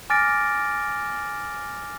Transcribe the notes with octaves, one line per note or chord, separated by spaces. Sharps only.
G#5 D6 F6 A6 A#6 D7